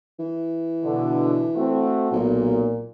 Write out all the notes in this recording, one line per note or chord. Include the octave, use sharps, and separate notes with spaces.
E3
B2 D3
A3 C4 F#4
B1 A#2